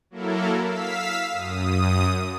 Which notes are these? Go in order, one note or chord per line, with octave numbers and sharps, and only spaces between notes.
F#3 A#3 E4 A4 A#4
F5 E6 B6
F#2 D#6